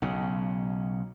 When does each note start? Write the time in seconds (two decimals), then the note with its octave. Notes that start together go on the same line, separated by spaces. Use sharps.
0.02 B1 C#3